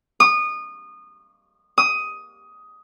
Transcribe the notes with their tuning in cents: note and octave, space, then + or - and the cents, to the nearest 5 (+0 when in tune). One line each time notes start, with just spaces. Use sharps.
D#6 -25
D#6 +10